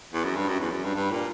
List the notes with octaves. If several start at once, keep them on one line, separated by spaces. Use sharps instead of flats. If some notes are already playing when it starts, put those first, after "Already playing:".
E2
F#2
G2
F#2
E2
F#2
G2
G2
A#2